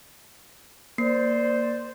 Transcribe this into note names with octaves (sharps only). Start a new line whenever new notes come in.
A#3 C5 D5 C7